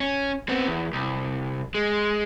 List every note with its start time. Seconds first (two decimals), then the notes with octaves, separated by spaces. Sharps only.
0.01 C#4
0.49 B3 C4
0.66 E2
0.93 C2
1.75 G#3